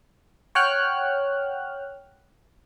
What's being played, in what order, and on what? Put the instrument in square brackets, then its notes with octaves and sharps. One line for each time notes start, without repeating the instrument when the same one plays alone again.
[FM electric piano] C#5 F#5 G5 F6 F#6